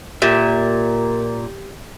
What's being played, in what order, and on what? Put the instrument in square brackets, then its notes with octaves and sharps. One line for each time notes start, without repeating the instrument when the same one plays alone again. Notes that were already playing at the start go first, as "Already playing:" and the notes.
[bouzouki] A#2 [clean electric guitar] G4 E5